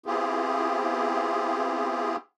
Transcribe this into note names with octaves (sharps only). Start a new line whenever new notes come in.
B3 C4 E4 F4 G4 G#4